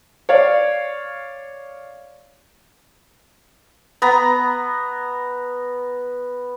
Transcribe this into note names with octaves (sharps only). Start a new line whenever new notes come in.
C#5 D5 F5
B3 A#5